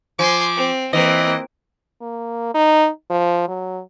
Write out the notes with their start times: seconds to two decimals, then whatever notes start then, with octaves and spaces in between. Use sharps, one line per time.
0.19 F3 G#5 C6 D6
0.56 C4
0.93 E3 A#3 C4 D#5
2.01 A#3
2.54 D#4
3.10 F3
3.48 F#3